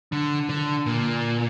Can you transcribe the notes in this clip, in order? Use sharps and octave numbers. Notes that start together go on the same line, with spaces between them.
D3
D3
A#2